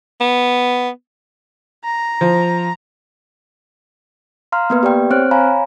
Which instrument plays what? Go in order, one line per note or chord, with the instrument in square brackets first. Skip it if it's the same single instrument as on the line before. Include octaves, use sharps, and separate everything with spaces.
[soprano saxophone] B3
[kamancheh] A#5
[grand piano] F3
[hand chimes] F5 A#5 C6 F6
A#3 B3 B4
G4 D5 G5
C4 C5 C#5 F6 F#6 D7
C#5 F5 G#5 A#5 B5